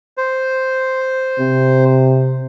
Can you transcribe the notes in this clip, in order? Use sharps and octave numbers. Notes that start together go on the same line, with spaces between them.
C5
C3